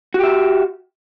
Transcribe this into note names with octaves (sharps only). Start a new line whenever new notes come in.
F#4 G4 E5